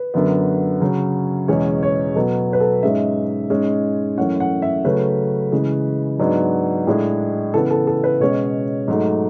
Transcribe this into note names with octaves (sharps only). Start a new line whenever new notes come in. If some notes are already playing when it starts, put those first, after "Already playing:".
Already playing: B4
F#2 D3 F#3 B3
C#3 F#3 C#4
E2 B2 G#3 C#4 C#5
C#5
B2 F#3 B3 A4
B4
A4
G#2 G#3 C#4 E5
G#2 G#3 C#4
F#2 E3 A3 C#4 F#5
F#5
E5
C#3 F#3 A3 C#4 B4
C#3 E3 G#3
G#2 F#3 B3 D4
A2 G#3 D4
C#3 E3 B3 A4
A4
A4
B4
B2 G#3 C#4 C#5
G#2 F#3 A3